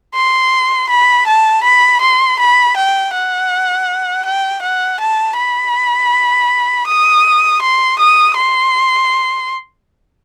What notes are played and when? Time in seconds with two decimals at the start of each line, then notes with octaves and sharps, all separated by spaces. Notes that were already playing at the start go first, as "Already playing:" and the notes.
0.15 C6
0.89 B5
1.27 A5
1.63 B5
2.01 C6
2.39 B5
2.76 G5
3.14 F#5
4.25 G5
4.62 F#5
5.00 A5
5.37 B5
6.87 D#6
7.62 C6
7.99 D#6
8.37 C6